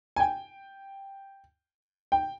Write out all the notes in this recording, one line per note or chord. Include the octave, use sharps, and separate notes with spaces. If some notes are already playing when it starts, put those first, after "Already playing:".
G#5
G5
G5